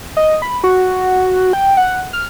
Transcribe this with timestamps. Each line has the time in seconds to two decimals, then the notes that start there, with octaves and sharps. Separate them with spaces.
0.17 D#5
0.42 B5
0.64 F#4
1.53 G5
1.77 F#5
2.13 F6